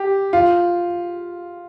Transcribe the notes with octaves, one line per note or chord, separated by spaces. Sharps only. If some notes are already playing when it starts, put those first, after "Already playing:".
Already playing: G4
F4